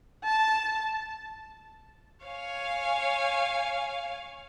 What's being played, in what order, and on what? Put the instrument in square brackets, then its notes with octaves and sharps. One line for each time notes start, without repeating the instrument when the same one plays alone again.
[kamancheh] A5
[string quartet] C#5 F5 G#5